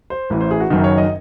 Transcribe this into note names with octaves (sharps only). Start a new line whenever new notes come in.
C5
A1 A2 E3
C5
G#4
F#4
F#1 F#2 D#3
C#5
D#5